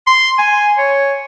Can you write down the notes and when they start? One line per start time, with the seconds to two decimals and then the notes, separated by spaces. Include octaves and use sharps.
0.07 C6
0.38 G#5
0.78 C#5